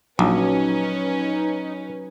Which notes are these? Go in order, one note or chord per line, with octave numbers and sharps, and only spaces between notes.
A#1 F#3 C#4 D#4 B4